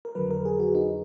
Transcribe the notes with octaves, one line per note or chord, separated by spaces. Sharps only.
A#4
F2 D3 F#3 B4
A#4
G#4
F#4
D#4